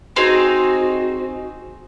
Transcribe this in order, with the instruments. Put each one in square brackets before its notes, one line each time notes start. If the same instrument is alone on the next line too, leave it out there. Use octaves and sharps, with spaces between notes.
[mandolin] C4 D#4 G#4 [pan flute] F#4